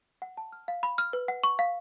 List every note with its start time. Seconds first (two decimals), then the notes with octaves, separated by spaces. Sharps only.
0.22 F#5
0.37 A5
0.52 F6
0.68 F5
0.83 B5
0.98 F6
1.13 B4
1.28 F#5
1.44 C#6
1.59 F5